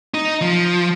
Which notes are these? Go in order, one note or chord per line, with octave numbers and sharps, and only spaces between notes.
D#4
F3